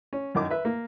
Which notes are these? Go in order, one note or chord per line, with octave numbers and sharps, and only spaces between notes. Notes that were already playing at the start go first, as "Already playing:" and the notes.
C#4
F#2 D#3 D6
B4 E5
A#3